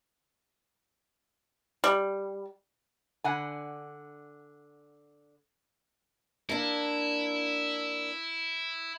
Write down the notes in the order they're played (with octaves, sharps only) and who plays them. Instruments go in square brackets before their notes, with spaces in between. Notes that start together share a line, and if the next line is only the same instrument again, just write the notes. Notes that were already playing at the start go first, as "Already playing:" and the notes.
[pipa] G3
[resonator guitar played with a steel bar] D3 F#5 G#5
[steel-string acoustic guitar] A#3 D4 [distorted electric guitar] E4